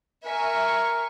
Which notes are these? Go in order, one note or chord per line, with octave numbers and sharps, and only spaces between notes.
A#4 E5 G#5 C#6